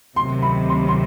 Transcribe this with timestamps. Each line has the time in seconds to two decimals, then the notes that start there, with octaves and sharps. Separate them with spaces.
0.16 D2 C3 D#3 F#3 C6
0.42 B5
0.69 C6
0.88 C6